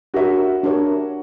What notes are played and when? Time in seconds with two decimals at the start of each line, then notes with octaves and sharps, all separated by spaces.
0.14 D4 F#4 G4 A#4 C#5 E5
0.63 D4 G4 A#4 C#5 E5